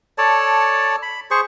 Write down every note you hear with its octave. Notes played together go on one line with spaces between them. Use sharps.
A4 C#5 D5 A5
B5
G#4 C5 C#6